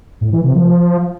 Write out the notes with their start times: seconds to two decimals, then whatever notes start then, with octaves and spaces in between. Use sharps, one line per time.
0.21 A2
0.33 E3
0.44 C3
0.55 F3